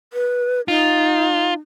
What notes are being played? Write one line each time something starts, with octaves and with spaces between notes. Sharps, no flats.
B4
D#4 F4